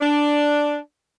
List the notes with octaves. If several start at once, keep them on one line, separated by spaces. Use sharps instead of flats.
D4